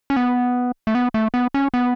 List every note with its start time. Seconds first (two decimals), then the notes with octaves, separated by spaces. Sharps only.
0.10 C#4
0.16 B3
0.87 A3
0.95 B3
1.14 A3
1.34 B3
1.54 C#4
1.74 B3